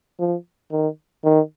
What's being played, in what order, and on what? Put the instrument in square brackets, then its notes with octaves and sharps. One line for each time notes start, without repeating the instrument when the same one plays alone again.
[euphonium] F3
D#3
D#3